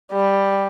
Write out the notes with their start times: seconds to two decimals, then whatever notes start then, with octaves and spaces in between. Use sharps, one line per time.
0.12 G3